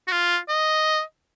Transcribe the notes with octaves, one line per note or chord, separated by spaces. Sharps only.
F#4
F4
D#5